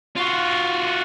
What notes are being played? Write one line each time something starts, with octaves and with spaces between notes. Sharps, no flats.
F4 F#4